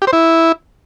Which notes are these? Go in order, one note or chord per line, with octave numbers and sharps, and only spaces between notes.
G4
C5
E4